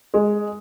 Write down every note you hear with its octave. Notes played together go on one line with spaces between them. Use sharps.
G#3